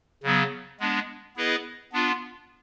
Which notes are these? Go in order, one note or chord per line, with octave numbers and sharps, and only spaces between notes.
C#3 F#3 B3
G#3 B3 D4
B3 E4 G#4 B4 D#5
B3 D4 F4